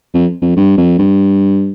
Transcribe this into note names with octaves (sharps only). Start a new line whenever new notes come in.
F2
F2
G2
F2
G2